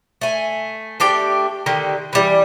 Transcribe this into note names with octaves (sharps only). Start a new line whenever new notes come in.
A3 G#5
A3 D4 G4 G5
D3 D#3 G4
E3 G3